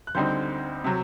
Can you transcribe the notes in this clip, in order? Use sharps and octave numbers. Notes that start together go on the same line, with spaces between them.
F#6
D2 D3 G3 C4 D#4 G6
C3 F#3